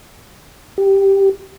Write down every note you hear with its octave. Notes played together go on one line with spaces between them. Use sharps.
G4